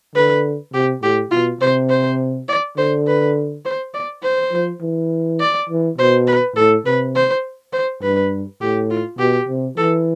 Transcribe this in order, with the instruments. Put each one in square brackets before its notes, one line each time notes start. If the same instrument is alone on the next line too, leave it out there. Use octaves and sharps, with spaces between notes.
[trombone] D3 [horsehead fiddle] B4
[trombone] C3 [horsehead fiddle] G4
[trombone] A2 [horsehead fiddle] G4
[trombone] B2 [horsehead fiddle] F4
[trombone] C3 [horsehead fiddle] C5
[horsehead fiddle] C5
D5
[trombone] D3 [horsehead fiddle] C5
[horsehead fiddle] B4
C5
D5
C5
[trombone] F3
E3
[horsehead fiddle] D5
[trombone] E3
[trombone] B2 [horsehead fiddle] C5
[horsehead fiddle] B4
[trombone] A2 [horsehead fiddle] A4
[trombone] C3 [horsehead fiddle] B4
[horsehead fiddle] C5
C5
[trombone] G2 [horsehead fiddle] B4
[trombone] A2 [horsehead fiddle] G4
[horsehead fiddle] F4
[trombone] B2 [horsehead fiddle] G4
[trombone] C3
[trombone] E3 [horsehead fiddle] A4